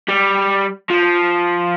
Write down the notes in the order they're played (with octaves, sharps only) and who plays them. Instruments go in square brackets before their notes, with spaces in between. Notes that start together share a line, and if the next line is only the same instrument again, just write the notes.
[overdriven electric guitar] G3
F3